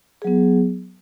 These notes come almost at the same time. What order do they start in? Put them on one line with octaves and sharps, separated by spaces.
G#4 F#3 B3